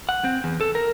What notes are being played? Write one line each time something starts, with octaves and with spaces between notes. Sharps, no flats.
F#5
C4
E2
A4
A#4